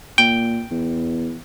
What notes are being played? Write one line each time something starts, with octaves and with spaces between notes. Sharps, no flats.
A#2 G5
E2